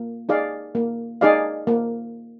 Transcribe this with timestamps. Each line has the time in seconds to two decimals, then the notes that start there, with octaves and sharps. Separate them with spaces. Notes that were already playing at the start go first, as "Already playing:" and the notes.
Already playing: A#3
0.29 D#4 G#4 D5 F5
0.75 A#3
1.21 D#4 G#4 D5 F5
1.67 A#3